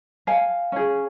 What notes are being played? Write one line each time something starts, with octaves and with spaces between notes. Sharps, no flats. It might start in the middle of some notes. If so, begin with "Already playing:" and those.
F5 G#5
C#4 G#4